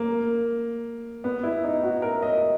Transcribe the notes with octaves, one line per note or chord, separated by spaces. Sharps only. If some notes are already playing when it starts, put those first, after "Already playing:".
Already playing: A#3
B3
E4
D#4
F#4
A#4
D#5